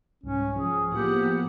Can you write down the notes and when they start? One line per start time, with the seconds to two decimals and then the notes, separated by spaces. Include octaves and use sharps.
0.24 C2 G#2 C#4
0.56 F3 G#4
0.92 A2 F3 A#3 B3 G4 F#5